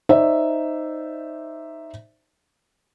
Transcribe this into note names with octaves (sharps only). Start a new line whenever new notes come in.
D#4 C5 D5 E5